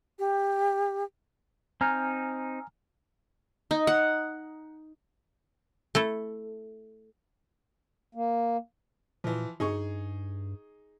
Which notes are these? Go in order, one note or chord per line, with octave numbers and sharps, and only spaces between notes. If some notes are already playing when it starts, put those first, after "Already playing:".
G4
C4 D#4 G#5 A#5 F6 G6
D#4
F#5
A3 E4 A4
A#3
A#2 E3 F3
G2 D#4 G#4 C#6